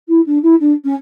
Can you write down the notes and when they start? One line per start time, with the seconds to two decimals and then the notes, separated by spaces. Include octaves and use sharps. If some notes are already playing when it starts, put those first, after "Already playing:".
0.08 E4
0.26 D4
0.42 E4
0.60 D4
0.84 C#4